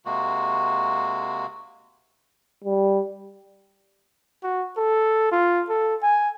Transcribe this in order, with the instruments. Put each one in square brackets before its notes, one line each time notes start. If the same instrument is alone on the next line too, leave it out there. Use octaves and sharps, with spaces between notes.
[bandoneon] C3 G#3 A#3 F#4
[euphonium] G3
[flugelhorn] F#4
A4
F4
A4
G#5